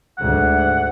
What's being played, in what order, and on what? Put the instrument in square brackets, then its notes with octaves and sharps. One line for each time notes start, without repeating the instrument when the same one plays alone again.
[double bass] D2 G#2 [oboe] F#5